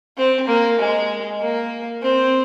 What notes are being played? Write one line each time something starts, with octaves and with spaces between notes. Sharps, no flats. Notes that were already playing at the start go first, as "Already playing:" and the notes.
C4
A#3
G#3
A#3
C4